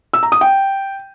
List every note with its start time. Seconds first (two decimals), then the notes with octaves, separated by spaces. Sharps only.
0.14 E6
0.23 A#5
0.32 D#6
0.41 G5